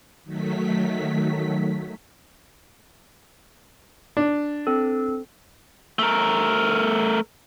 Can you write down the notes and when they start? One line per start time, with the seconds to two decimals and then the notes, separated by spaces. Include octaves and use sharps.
0.24 D#3 F#3 A3 B6
4.17 D4
4.67 C4 A4
5.99 A3 A#4